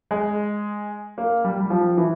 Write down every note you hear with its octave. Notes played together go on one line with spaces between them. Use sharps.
G#3
A#3
G3
G3
F3
E3